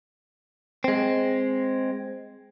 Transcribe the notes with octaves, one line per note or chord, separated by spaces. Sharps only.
G#3 C4